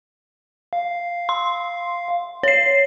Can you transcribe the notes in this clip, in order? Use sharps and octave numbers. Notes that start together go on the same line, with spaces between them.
F5
C6
C#5 C7